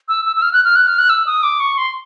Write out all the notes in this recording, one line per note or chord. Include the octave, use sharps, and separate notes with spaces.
E6
E6
E6
F6
F#6
F6
F#6
F6
F#6
E6
D#6
D6
C#6
C6